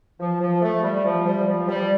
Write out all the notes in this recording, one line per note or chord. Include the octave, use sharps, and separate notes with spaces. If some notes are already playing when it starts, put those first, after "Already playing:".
F3
F3
A3
G3
F3
G3
F3
G3